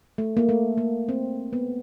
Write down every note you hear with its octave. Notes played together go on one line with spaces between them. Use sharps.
A3
A#3
A3
A#3
C4
B3